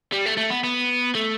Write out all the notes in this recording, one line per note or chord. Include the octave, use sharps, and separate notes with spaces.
G3
A3
A3
B3
B3
A3